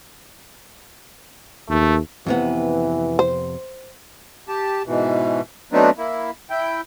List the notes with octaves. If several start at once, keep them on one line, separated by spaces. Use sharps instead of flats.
D#2 A3
F2 C3 E3 B3
C5
G4 A5
G#2 B2 E3
F#3 A3 B3 C4 D4 D#4
A#3 E4
E4 G5